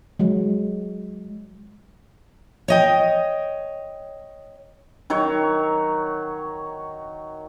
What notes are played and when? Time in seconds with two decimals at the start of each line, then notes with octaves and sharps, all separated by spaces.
0.19 F#3 G#3
2.68 C#5 D#5 G5
5.10 D#3 F#3 C#5